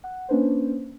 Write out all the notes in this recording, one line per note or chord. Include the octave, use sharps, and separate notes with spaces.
F#5
A#3 C#4 D4 B4 C5